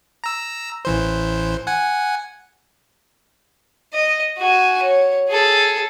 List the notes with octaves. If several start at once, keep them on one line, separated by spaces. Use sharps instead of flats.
A#5 E6
A1 E3 C5
F#5 G#5
D#5
F#4 G#5
C#5
G#4 A4